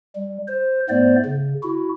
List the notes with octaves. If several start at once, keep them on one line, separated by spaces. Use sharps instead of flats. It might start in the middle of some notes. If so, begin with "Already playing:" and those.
G3
C5
G#2 A3 B3 C5 D5
C#3
E4 F#4